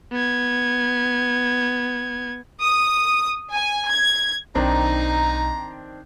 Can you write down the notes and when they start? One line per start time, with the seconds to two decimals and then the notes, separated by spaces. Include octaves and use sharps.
0.12 B3 G#6
2.59 D#6
3.51 G#5
3.87 G#6
4.55 B1 D#3 C4 D4 D#4 A#5